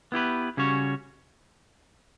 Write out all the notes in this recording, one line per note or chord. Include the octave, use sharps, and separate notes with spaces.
B3 E4 G4 B4
C#3 G3 C#4 F#4 C#5